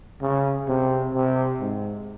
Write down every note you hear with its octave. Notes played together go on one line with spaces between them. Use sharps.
C#3
C3
C3
G#2